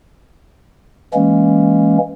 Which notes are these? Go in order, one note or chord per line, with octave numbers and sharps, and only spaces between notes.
E3 G#3 A#3 C#4